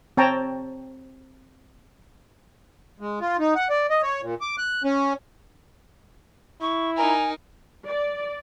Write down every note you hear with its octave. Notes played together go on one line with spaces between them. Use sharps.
C4 C#5 G5 A5 A#5
G#3
F4
D#4
F#5
D5
D#5
C#5
A#2
D6
F#6
C#4
E4 C#6
D#4 A#4 G#5 A#5
D5